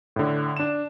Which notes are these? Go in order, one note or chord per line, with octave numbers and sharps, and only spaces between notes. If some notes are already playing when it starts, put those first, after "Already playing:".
A2 D3
D4 E7